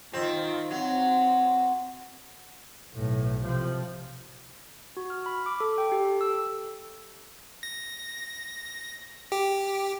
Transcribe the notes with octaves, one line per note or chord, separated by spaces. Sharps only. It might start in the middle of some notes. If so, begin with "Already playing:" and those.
D#3 C4 F4
F#3 C4
B1 A2
C3 F3
F#4
F6
B5
D6
A4
G5
G4
A4
E6
A#6
G4